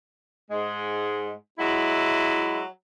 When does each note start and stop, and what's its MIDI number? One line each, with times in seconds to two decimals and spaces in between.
0.51 1.31 44
0.51 1.31 56
1.59 2.61 54
1.59 2.61 56
1.59 2.61 64